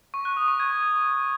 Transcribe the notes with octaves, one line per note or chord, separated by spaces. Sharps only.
C#6
F#6
D#6
C#6
G#6